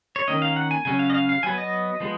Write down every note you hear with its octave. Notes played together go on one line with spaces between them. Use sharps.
C#5
D#3 A#3 C#4 D#5
F5
F#5
G#5
C#3 F#3 C#4 G#5
F5
D#5
F5
F5
F#3 B3 G#5
D#5
F3 G#3 B3